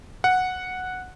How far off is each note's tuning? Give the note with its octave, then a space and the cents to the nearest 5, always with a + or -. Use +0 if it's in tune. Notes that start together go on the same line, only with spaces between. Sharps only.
F#5 -5